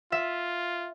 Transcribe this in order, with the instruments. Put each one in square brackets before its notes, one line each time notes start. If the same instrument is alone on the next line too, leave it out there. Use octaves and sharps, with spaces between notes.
[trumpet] F4 [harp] E5